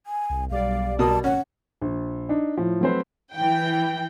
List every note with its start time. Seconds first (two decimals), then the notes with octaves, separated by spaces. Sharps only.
0.06 G#5
0.30 C2
0.50 B1 G3 D5 F5
0.99 B2 A#4 A5 D#6
1.24 G#1 C#4 F#5
1.82 A#1
2.29 D4 D#4
2.57 A2 F3
2.81 F#3 A3 C4 B4 C5
3.35 E3 G5